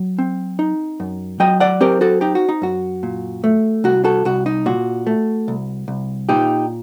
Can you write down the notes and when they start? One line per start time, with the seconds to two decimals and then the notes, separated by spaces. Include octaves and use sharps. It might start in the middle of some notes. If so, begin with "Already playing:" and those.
Already playing: F#3
0.19 C4
0.59 D#4
1.00 F#2
1.40 F#3 D#5 G5
1.60 D5 F#5
1.81 C4 G4 A#4
2.01 F#4 A4
2.21 D#4 G4
2.35 F#4
2.49 D#4
2.62 F#2 F#4
3.03 A#2
3.44 A3
3.84 C2 F#4
4.05 F#4 A4
4.25 C2 F#4
4.46 D#4
4.66 A#2 F#4
5.07 A3
5.48 C2
5.88 C2
6.29 A#2 D#4 G4